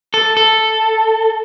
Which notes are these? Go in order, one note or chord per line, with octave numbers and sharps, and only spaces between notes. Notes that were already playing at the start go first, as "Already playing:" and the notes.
A4
A4